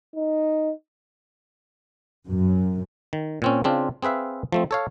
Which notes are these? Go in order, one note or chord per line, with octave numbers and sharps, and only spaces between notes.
D#4
F#2
D#3
A#2 C4 C#4
C#3 C4 D4 F4
C4 G#4 B4 E5 F5
F3 A3 C4
A4 C#5 F5